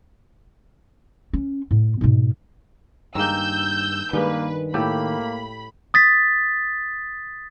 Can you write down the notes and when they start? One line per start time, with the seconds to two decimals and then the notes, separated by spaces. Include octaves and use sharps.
1.33 C#4
1.71 A2
2.01 G#2 B2
3.15 G2 D#3 G#3 A#3 E6 G6
4.13 G2 D#3 G#3 A#3 B4
4.74 A2 A#3 G4 A4 B5
5.94 D#6 A6 B6